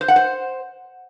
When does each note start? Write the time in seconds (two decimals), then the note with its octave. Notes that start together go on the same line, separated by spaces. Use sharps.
0.01 C5
0.08 F#5
0.16 C5